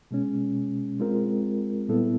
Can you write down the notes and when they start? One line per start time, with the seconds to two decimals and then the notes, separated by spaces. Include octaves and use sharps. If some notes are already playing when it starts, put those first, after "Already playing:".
0.11 B2 G#3 C#4
1.00 G#3 C4 F4 A#4
1.89 A#2 G3 B3 E4 A4